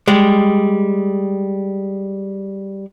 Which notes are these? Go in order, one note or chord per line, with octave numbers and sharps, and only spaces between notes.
G3 G#3